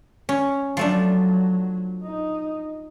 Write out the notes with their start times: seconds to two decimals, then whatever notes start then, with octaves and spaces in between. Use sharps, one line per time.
0.29 C#4
0.77 F3 F#3 A3 D4
2.03 D#4